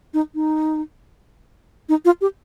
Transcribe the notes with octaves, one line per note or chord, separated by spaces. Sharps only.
D#4
D#4
D#4
F4
G4